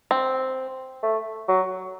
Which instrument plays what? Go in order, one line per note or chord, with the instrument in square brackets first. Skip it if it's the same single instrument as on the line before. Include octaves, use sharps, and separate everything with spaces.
[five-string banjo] C4
[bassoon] A3
F#3